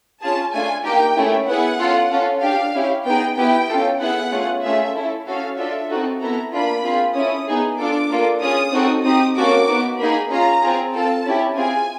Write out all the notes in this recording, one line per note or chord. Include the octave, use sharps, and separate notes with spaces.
C#4 F4 G#4 A5
A3 D4 F4 A4 G#5
A#3 D#4 G4 G5
A3 C#4 E4 G#4
B3 E4 G#4 F#5
C#4 F4 A4
C#4 F4 A4
D4 G4 F5
C#4 E4 G4
B3 D#4 G#4 G5
B3 E4 G4 G5
C#4 F4 A4
B3 E4 G#4 F#5
A3 C#4 F4 G#4
A3 C#4 F4 G#4 E5
C#4 E4 A4
C#4 F#4 A4 F5
D4 F4 A4 E5
C4 D#4 F#4 A4
B3 E4 A4 A#5
A#3 D4 F4 B5
C4 F4 G#4
C#4 E4 A4 D#6
B3 D#4 G#4
D4 F4 A4 D6
A#3 D4 F4 A4
C#4 F4 G#4 D#6
C4 D#4 F#4 A4
C4 D#4 G4 D#6
A#3 C#4 F#4 A4 D6
B3 D#4 F#4
A#3 D#4 G#4 B5
C#4 F4 G#4 A#5
C4 F4 G#4
C4 F4 A4 A5
C#4 E4 G4
C4 F4 G#4 G#5